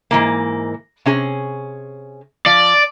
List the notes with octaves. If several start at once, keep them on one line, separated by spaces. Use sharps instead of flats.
G#2 E3 A#3
C3 C#4 G#4
F3 D5